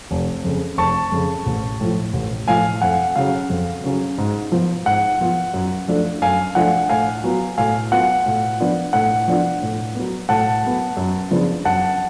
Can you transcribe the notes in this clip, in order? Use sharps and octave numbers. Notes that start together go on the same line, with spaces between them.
F1
F2 C#3
F1 A5 C#6
F2 C#3
A1
A2 F3
A1
A2 F3 F5 G#5
F2 F#5
C#3 F#3 C#4 F5
F2
C#3 F#3 C#4
G#2
F3 B3 F4
G#2 F#5
F3 B3 F4
F#2
F3 A3 D4 F4
F#2 F5 G#5
F3 A3 D4 F4 F#5
A2 F5 G#5
F#3 B3 F4
A2 F5 G#5
F#3 B3 F4 F#5
A2
F3 B3 D4 F4
A2 F#5
F3 B3 D4 F4
A2
F#3 B3
A2 F#5 A5
F#3 B3
F#2
C#3 F3 B3 D4
F#2 F#5 A5